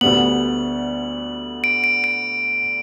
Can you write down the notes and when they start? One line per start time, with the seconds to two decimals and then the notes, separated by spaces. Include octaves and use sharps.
0.01 D2 D3 G3 B3 F#7
1.64 D7
1.84 D7
2.04 D7